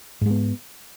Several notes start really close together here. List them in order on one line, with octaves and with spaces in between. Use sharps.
G#2 G#3 B3